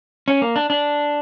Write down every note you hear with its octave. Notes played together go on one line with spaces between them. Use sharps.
C#4
A#3
D4
D4